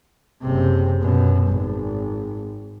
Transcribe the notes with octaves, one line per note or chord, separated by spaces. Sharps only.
F#1 C3
F#2 B2
G#1